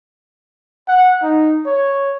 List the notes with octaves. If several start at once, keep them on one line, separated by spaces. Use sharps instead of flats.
F#5
D#4
C#5